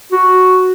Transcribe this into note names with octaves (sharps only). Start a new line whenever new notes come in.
F#4